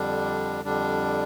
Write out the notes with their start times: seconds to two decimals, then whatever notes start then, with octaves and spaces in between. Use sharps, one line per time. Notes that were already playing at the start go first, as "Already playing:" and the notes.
Already playing: F2 D3 G3 D4
0.65 F2 D3 G3 D4